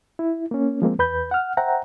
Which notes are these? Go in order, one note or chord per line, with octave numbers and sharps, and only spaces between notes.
E4
A#3 C#4
F3 G#3 A#3 C4
E2 B4 B5 G6
F#5 F6
C5 E5 F#5 G5 A#5